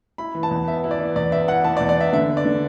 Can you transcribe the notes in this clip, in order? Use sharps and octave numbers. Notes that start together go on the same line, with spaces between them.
E4 B5
E3
A5
E2
B3 E5
E4
D5
E3
E2 D5
B3 E5
E4 F#5
E3 A5
D5
E2
D5
B3 E5
D3 E5
B3
D5
D3